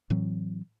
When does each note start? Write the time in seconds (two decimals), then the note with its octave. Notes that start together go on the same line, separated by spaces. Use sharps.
0.10 A2 E3 F#3 C4